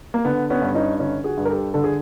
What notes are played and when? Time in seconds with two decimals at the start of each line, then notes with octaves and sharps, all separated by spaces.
0.14 A#3
0.25 D3 B3
0.50 B3 C#4
0.62 G2
0.74 C#4 D#4
0.99 D3 C#4 D#4
1.24 F#4 G#4
1.37 G2
1.45 A#4
1.49 G4 A4
1.74 D3 A4
1.84 G#4